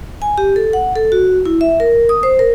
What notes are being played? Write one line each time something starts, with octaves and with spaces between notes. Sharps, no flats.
G#5
G4
A4
F#5
A4
F#4
E4
E5
A#4
D#6
C5
A#4